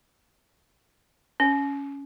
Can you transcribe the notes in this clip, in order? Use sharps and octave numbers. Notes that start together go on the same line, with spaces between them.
C#4